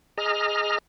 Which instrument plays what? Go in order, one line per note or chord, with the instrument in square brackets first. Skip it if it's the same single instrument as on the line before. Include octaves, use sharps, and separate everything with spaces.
[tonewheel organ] G#4 D#5 A#5 F6